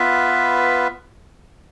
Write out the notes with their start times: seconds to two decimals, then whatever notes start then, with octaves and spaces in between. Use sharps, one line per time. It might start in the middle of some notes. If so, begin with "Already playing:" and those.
Already playing: B3 F4 B4 E5